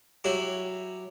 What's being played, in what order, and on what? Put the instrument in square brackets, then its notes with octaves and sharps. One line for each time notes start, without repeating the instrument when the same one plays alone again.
[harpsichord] F#3 E4 G4